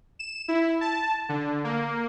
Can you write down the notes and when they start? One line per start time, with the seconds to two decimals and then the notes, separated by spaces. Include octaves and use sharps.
0.19 E7
0.48 E4
0.81 A5
1.29 D3
1.64 A#3